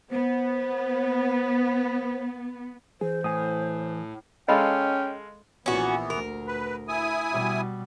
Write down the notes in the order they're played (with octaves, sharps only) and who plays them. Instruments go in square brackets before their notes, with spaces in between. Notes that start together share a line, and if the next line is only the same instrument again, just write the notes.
[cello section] B3 [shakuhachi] C5
[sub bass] E3 [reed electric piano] G#4 [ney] C5
[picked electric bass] A2 [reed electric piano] G#5 D#6
[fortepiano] G#3 A4 F5 [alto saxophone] C#4 [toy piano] D#5 B5 [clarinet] G5
[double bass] A#1 A#2 [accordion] E3 B3 [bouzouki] C#4 F#4
[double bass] D2 [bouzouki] A#4
[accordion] B4
E4 G#5 D#6
[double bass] B2 G3